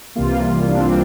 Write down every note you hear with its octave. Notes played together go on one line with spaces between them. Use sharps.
C2 C3 E3 G3 A#3 F4
D4
C4
D4